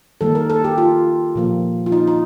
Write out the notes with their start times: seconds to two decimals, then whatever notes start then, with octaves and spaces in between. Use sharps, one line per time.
0.21 D#3 G3 A#3 A4
0.35 A#4
0.50 A4
0.64 G4
0.78 F4
1.35 A#2 F3 A#3
1.86 F4
1.92 D#4
2.07 D#4